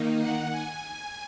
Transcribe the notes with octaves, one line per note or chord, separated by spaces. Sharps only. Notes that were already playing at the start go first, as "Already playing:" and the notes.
Already playing: D#3 A#3 D#4
F#5
G#5